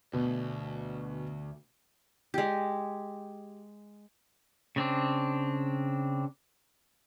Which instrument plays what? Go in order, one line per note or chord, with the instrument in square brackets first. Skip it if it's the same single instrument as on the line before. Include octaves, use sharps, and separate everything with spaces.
[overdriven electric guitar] D2 [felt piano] B2
[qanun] G#3 G4
[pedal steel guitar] C#3 C4 D4